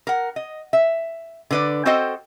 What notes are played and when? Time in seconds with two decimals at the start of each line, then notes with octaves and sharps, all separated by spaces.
0.07 A#4 F#5
0.36 D#5
0.73 E5
1.51 D3 B4 D5
1.86 C4 F#4 A4 C5 D#5 G5